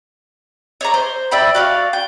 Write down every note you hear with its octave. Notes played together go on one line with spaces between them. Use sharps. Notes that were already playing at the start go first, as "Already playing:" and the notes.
C#5 D5 A#5
C5
D5 E5 G5 B5
F#4 D5 F5
G5